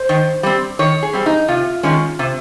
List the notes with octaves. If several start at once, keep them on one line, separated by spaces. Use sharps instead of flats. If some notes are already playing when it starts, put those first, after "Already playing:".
Already playing: C5
D#3
G3 C4
D#3 C#5
G#4
G3 C4
D#4
C3 F4
D#3 G#3 C#4
C3